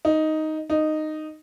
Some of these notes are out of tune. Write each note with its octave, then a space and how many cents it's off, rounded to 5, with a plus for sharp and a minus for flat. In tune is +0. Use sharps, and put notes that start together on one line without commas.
D#4 +5
D#4 -10